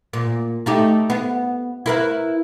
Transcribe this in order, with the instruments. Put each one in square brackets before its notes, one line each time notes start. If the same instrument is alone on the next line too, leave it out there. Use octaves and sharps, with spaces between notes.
[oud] A#2
A3 D#4 G4
B3
E4 A#4 B4